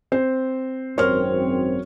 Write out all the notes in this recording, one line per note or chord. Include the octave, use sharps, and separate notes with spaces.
C4 C5
G#1 F#2 C4 A#4 C5 C#5 F6